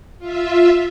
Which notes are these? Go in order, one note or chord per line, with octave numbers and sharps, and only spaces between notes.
F4 E5